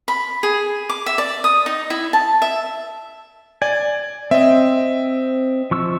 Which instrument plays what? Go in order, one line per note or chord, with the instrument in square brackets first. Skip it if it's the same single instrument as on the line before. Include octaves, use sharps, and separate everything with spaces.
[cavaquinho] B5
G#4
D6
E5
D5
D#6
D#4
E4
A5
E5
[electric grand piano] D5 [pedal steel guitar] G#5
[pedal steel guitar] C4 [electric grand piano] D#5 E5
[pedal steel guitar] F3 C#6 E6